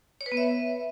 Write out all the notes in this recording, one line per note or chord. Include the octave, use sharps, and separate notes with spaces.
C#5
B4
B3
E5